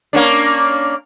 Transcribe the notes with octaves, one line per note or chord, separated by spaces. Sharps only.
A#3 C#4 D4